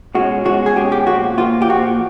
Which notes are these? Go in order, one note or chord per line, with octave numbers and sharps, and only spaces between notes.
B2 G#3 C#4 F#4
B2 G#3 C#4 F#4
G#4
B2 G#3 C#4 G4
G4
A#2 F3 A#3 F#4
A#2 F3 A#3 F4
G4
A#2 F3 A#3 F#4